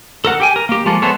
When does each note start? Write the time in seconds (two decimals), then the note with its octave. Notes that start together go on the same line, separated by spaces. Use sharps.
0.25 A4 A#4 F#5
0.40 G4 G5 G#5
0.56 A#4
0.69 A#3 G4
0.86 F3 G#3 A#3 A4
1.02 G#3 B3 A4 C5 C#5